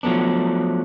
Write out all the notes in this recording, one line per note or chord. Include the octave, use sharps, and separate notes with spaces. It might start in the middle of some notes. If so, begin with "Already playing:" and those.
F3 F#3 A3 B3 D4